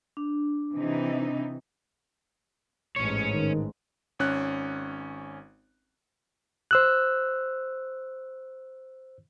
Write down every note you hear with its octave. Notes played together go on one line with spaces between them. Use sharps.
D4
C3 E3 D#4
A1 G#2 C#4 C#5
D#3
G#1 C#4 F#6
C5 E6 F#6